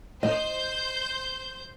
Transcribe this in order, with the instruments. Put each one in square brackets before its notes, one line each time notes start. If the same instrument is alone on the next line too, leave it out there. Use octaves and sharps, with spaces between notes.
[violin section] C5 G6 [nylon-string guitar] D#5